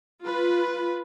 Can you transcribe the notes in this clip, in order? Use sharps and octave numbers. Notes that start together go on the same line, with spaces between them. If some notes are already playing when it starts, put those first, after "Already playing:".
F4 B4